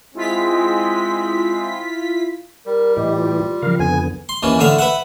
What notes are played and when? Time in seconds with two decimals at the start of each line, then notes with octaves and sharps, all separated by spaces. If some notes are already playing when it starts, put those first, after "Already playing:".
0.15 G#3 C4 E4 F4 B6
2.66 G3 A#4
2.97 A2 E3 G4 D#5
3.16 F4
3.62 C#3 F3 A#4 F5
3.80 F2 D3 B3 G#5
4.29 C6
4.43 D#2 E3 C#4
4.59 A2 D3 E5 F5
4.79 B4 E5 F#5